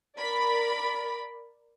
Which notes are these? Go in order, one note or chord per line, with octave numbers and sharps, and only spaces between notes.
A#4 D5 B5